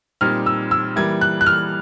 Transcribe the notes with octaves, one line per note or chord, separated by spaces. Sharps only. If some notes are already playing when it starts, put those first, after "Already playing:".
A#2 G3 C4 D#4 F6
E6
E6
E3 G3 A#3 G#6
F#6
F#6
F6